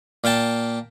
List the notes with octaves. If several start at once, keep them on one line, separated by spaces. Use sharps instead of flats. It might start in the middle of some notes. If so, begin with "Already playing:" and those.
A#2 F5 G5 A5